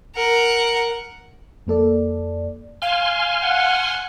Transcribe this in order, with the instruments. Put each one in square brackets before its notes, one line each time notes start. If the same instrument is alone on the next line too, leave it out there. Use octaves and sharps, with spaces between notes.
[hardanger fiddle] A#4 F#5
[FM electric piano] F2 A#3 A4 D5
[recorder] F5 [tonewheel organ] G#5 C6 F6
[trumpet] F#5